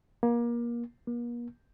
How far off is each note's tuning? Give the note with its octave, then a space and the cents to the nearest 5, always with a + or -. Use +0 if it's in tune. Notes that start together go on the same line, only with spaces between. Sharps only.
A#3 +25
A#3 +40